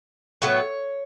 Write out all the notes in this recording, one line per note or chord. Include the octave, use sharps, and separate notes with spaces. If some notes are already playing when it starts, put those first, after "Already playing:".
A2 F#3 B3 C#5